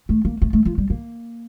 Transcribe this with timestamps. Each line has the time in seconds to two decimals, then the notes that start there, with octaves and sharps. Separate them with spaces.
0.09 A3
0.25 A#3
0.42 A3
0.53 A3
0.65 F3
0.78 G3
0.90 A#3